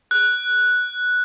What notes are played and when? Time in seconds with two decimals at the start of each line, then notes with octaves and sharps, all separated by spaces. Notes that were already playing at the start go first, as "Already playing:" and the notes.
0.11 F#6